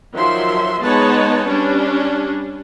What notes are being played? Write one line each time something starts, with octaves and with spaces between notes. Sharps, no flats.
D#3 F3 F#3 E5 C6
G#3 B3 D#4 B4 C#5 A5
G3 C#4 D4